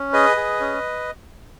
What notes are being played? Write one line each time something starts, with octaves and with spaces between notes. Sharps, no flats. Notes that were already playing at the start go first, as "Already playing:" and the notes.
Already playing: C#4
G#4 B4 D#5
G#4
C#4